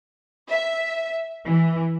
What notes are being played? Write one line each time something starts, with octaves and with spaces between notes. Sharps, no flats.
E5
E3